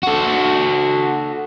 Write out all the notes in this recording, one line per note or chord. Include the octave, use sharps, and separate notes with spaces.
F#4 A4